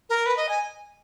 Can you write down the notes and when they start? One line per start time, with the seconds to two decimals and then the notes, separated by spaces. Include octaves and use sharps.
0.10 A#4
0.26 B4
0.37 D#5
0.49 G#5